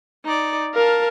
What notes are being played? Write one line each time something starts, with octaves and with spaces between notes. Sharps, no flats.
D#4 D5
A#4 F5 A5